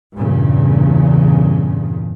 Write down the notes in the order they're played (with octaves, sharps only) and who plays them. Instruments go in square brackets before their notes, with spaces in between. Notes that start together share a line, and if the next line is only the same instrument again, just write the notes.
[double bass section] E2 G2 A#2 C#3